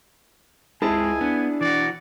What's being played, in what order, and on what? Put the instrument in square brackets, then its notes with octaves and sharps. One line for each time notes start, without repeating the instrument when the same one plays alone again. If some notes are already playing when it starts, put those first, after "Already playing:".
[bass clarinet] C#2 [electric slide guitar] G#3 C4 [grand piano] E4 G#4 A5 [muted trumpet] G#5
[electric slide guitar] B3 [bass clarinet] D4
[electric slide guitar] E3 F#4 [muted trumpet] D5